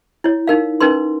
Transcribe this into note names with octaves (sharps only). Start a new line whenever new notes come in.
E4 C#5
D#4 A#4 F5
C#4 D#4 A#4 B4 C6